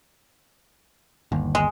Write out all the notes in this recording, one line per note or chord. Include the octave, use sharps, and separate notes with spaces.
G1 D#2
G#3